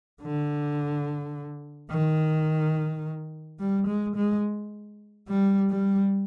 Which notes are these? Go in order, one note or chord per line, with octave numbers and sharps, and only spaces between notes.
D3
D#3
G3
G#3
G#3
G3
G3